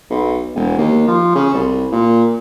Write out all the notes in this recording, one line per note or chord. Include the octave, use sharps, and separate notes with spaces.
B1
E1
D#2
F3
C#3
C2
A#2